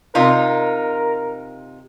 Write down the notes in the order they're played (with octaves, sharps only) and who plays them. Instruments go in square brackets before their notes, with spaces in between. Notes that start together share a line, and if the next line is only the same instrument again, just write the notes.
[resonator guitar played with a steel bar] C3 D#4 F4 [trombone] A#4